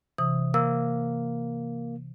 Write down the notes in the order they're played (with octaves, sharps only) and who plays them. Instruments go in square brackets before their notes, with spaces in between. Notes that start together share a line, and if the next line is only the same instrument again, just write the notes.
[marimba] C3 E3 D#6
[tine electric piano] A#3 [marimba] E6